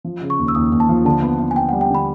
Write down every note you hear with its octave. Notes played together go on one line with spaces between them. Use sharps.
F3
C#3
C#6
D#2
E6
D#2 D#6
D#2
A5
F3
D3 A5
B3
B3
G#5
B3 G5
F#5
G3
G5
D3 B5